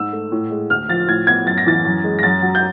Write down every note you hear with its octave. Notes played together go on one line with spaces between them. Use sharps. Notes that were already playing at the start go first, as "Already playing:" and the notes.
Already playing: G#2 E6
A3
A2
G#3
D2 F6
F3 A6
A2 G#6
B3 G#6
F#2 A6
A#6
E3 A6
F#2
G#3
A#6
F#2 A6
F#3
G6